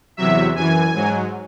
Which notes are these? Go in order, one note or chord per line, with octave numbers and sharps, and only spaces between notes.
E2 C3 F#3 E5
F#2 E3 G#5
G#2 F#3